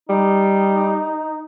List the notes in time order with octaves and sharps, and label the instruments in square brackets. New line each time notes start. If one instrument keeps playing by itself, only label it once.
[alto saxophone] G3 [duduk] D#4